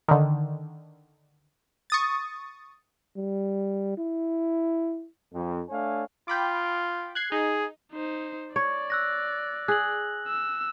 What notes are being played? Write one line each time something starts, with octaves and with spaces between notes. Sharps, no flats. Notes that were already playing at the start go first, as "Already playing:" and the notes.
D3 D#3
C#6 D#6 A6
G3
E4
F2
A3 D4 C#5 F5 G#5
F4 G5 B5 D6
F#6 G#6 C7
D#4 G#4
D#4 C5
C#5 D5
E6 F#6 A#6
G#4 F#6 F#7
E6